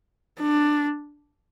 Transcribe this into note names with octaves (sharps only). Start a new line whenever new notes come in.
D4